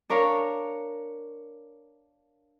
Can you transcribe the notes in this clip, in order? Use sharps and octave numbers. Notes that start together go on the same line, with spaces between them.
D4 A#4 C#5 F5